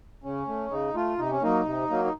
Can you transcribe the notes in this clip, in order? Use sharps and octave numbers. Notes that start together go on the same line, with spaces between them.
C#3 C#4
A3
C#3 D#4
A3 F4
C3 D#4
C#4
F#3 A#3 D#4
C3
F#3 A#3
D#4